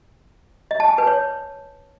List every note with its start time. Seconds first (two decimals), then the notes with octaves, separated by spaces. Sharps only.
0.71 D#5
0.80 A5
0.89 G#5
0.98 B4
1.07 C#5